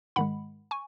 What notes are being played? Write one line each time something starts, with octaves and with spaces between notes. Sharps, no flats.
G#2 D#3 G#3 F#5 B5
G#5 C#6